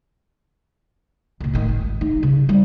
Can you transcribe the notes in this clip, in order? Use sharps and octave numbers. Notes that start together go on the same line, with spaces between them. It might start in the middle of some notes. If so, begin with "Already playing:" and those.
C#2 A#2
A2 D#3
G#1
D#4
C#3
G3